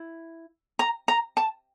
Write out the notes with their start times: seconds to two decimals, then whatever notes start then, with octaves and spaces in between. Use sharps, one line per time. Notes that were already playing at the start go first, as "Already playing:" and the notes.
Already playing: E4
0.79 A#5
1.08 A#5
1.37 A5